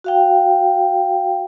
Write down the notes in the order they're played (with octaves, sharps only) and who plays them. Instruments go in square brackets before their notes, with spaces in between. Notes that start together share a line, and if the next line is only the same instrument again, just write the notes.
[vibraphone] F#4 F5 G5